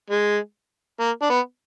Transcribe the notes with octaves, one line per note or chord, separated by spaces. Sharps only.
G#3
A#3
D4
B3